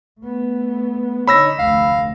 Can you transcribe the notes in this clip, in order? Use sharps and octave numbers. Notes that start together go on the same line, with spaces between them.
A3 B3
D3 D#4 C#5 B5 E6 A#6
F1 D2 F5